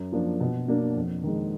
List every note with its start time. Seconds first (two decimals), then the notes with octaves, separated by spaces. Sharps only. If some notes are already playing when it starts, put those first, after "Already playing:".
Already playing: F#2
0.12 F3 A#3 D4
0.40 B2
0.68 F#3 A#3 D4
0.96 F2
1.23 D#3 G#3